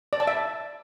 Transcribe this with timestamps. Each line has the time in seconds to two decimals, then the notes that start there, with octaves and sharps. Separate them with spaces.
0.13 D5
0.20 A5
0.27 E5